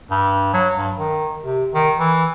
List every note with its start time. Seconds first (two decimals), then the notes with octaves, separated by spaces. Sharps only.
0.11 G2
0.54 F#3
0.77 G2
0.97 D#3
1.42 C3
1.74 D#3
1.98 E3